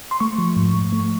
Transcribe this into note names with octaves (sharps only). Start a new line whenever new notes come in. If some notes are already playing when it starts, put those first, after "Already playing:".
C6
A3 C#6
F3
G#2
G#2
A3